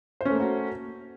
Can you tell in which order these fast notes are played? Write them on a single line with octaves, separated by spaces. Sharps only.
C5 C#4 A3 A#3 F#4